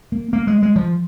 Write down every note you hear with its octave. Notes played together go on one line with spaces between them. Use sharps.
A#3
A#3
G#3
G#3
F3